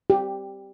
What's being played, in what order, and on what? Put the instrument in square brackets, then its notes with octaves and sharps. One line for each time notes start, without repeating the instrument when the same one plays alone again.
[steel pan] G4